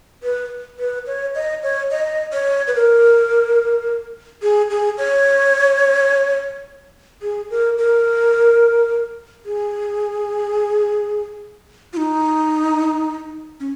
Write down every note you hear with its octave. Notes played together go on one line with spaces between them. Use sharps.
B4
B4
C#5
D#5
C#5
D#5
C#5
B4
A#4
G#4
G#4
C#5
G#4
A#4
A#4
G#4
F4
D#4
C#4